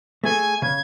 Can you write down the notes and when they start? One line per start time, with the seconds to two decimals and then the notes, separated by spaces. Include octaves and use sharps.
0.24 A3 G#4 A4 G#5
0.62 C#3 G#6